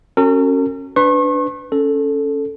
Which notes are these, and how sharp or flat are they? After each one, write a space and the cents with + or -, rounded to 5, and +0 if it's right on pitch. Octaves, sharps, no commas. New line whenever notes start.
C#4 -20 F#4 +10 A#4 -45
D4 -10 B4 +20 C#6 -40
C#4 +0 A4 +0